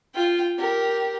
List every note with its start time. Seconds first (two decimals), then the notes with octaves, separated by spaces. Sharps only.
0.14 F4 G5
0.58 G4 A#4